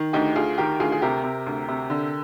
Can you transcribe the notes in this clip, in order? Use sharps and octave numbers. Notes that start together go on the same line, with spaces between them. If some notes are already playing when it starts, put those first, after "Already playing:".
Already playing: D#3
D2 D#4 G4
D2 F4 G#4
D#3 G4 A#4
D2 F4 G#4
G#4
C3 G4 A#4
C3
D2
C3
D3